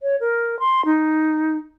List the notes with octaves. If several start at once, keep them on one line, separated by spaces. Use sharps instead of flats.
C#5
A#4
C6
D#4